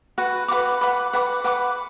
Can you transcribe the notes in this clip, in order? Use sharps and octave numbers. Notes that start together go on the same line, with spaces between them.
F#4 B4 F#5
B4 F#5 B5 D6
B4 F#5 B5 D6
B4 F#5 B5 D6
B4 F#5 B5 D6